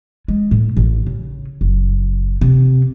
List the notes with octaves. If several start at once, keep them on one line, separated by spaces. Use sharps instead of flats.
G#3
A2
A1
C#3
F#1
C3